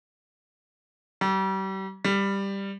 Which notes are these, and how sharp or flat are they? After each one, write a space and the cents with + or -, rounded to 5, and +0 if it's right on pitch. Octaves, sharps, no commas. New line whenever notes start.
G3 -35
G3 +10